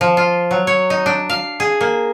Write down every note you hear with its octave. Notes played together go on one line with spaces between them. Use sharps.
F3
F4
F#3
C#5
D#4
D4
F5
G#4
A#3